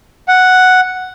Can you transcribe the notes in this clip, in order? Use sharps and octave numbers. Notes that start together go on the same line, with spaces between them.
F#5